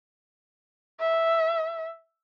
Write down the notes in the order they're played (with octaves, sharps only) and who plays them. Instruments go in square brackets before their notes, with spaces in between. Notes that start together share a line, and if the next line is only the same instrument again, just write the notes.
[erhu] E5